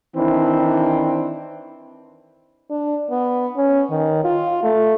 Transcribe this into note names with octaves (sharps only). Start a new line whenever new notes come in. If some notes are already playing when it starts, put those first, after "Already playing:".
D#3 E3 C4 D4 E4
D4
B3
C#4
D#3
F4
A3